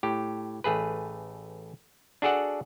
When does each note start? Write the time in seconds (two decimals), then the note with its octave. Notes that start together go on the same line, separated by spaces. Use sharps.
0.03 A2 G4
0.64 A1 A3 G#4 B4
2.22 D4 F#4 G#4 A4 D5 F#5